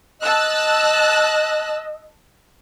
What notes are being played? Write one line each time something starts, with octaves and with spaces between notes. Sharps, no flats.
D#5 A5 E6 F#6